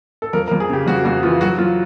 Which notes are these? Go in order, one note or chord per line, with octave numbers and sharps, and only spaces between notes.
A4
F2 A#4
A#4
F2
G#4
C#3 G4
F2 F#4
F2 F#4
E3 F4
F#3 F#4
F#3 F4